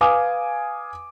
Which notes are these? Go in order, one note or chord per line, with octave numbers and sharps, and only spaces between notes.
B4 F5 G#5 D6 D#6